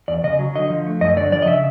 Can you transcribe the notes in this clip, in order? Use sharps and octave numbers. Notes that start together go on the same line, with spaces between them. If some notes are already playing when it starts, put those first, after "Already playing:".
E2 D5
C#3 D#5
F#3
D3 D#5
F3
A3
F#2 D#5
D3 D5
F3 D5
D#5
C#3 E5